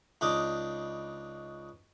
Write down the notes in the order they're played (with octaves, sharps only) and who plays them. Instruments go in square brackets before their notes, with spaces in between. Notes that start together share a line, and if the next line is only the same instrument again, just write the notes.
[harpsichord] C#2 D4 D#4 D6